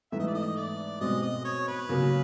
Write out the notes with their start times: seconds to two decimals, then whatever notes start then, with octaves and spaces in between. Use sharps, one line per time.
0.12 G#2 E3 A3 E5
0.20 D#5
0.27 D5
0.35 D#5
0.56 D5
1.00 B2 G#3 C4 D#5
1.22 D#5
1.45 C#5
1.68 B4
1.89 C#3 F#3 A#3 C#4